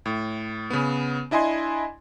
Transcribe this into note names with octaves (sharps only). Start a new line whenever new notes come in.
A2
C#3 B3
D4 E4 D#5 G#5 C6